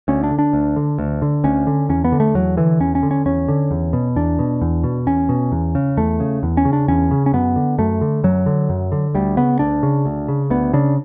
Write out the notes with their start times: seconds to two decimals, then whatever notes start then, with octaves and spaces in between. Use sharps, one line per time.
0.08 D2 C#4
0.23 D4
0.31 D3
0.39 D4
0.53 D2
0.76 D3
0.99 D2
1.22 D3
1.44 D2 C#4
1.67 D3
1.89 E2 C#4
2.04 B3
2.12 D3
2.20 A3
2.35 E2 F#3
2.57 D3 E3
2.80 E2 C#4
2.95 C#4
3.03 D3
3.11 C#4
3.26 E2 C#4
3.48 D3
3.71 E2
3.93 B2
4.16 E2 D4
4.39 B2
4.61 E2
4.84 B2
5.07 E2 C#4
5.29 B2
5.52 E2
5.75 C#3
5.97 E2 A3
6.20 C#3
6.43 E2
6.57 C#4
6.65 C#3
6.73 D4
6.88 E2 C#4
7.11 C#3
7.26 C#4
7.33 F#2 B3
7.56 D3
7.78 F#2 A3
8.01 D3
8.24 F#2 F#3
8.46 D3
8.69 F#2
8.92 D3
9.15 D2 G3
9.37 C#3 B3
9.59 D2 D4
9.83 C#3
10.06 D2
10.28 C#3
10.50 D2 B3
10.73 C#3 D4